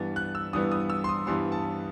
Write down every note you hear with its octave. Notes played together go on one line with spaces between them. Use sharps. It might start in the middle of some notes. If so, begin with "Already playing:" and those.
Already playing: G2 E3 G3 B3 A6
F#6
E6
G2 E3 G3 B3 D#6
D#6
E6
C6
D#6
G2 E3 G3 B3 C6
A5